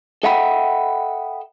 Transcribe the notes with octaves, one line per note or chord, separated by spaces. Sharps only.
A4 D#5 E5 F#5 G5 B5